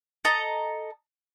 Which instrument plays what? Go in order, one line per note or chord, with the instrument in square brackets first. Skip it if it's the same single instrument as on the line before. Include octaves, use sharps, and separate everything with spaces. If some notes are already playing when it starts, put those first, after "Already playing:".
[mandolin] A4 D#5 A#5